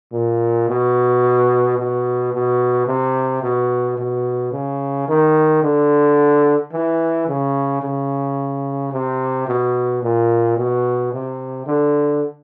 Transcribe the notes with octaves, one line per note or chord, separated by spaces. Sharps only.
A#2
B2
B2
B2
C3
B2
B2
C#3
D#3
D3
E3
C#3
C#3
C3
B2
A#2
B2
C3
D3